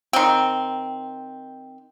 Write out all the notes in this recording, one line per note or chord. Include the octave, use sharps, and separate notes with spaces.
D#3 C4